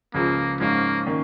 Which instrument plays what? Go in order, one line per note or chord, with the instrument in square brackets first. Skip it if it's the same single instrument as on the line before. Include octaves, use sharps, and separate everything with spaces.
[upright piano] C#2 C#3 F3 [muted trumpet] A#3
[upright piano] G#2 F3 C#4 F4 [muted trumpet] A#3
[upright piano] D#3 A#3 C#4